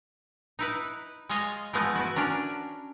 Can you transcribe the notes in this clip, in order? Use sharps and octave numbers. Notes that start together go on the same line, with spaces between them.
D#4 E4 B4
G#3 F4 C#5 D#5 F5
E3 F3 G#3 A3 B3
B3 E4 F#4
C#4 D4 A#4